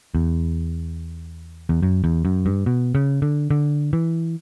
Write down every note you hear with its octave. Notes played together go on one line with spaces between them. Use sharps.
E2
E2
F#2
E2
F#2
G2
B2
C#3
D3
D3
E3